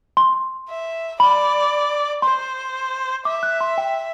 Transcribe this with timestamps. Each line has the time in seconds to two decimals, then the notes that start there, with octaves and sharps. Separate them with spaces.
0.17 C6
0.69 E5
1.20 D5 B5
2.22 C5 C6
3.25 E5 D6
3.43 F#6
3.61 C6
3.78 G5